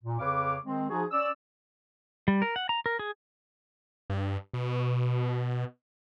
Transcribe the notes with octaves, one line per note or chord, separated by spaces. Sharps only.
A#2
F2 C#3 B4 C#5 F5 D6
D#3 G#3 C4
F3 D#4 F#4 G#4
C#4 D5 E6
G3
A#4
F#5
A#5
A#4
G#4
G2
B2